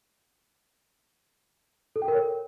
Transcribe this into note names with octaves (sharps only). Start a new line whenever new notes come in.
A4
G5
A#4
C#5